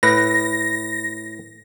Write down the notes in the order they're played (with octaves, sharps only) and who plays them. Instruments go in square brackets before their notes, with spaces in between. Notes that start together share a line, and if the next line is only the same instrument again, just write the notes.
[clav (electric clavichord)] A2 B4 [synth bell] A#6